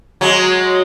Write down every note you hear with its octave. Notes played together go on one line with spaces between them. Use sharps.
F#3 G#3